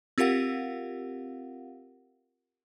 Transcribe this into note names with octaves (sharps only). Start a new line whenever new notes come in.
C4 F4 G4 A#4 F5 F#5